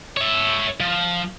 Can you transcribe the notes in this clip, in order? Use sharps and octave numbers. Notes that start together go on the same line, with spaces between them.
C#5 E5
F3